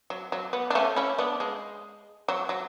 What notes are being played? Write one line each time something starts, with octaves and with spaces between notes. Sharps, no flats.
F#3
F#3
B3
D4
A3 C#4
C#4 E4
B3 D4
G#3
F#3
F#3